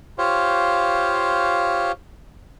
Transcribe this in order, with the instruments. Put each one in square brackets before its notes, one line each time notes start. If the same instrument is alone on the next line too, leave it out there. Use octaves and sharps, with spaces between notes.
[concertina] F4 G4 C5 C#5 F5